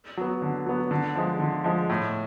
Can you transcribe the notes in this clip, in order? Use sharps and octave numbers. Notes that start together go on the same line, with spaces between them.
F#3 B3
D3
F#3 B3
D3
F3 G#3
D3
F3 G#3
A2